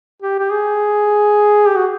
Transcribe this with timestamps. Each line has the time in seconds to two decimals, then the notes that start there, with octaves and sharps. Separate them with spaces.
0.22 G4
0.39 G4
0.51 G#4
1.67 G4
1.76 F#4